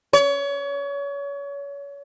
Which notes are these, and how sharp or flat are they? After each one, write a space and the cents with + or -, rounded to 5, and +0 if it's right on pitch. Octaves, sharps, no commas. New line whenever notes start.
C#5 +30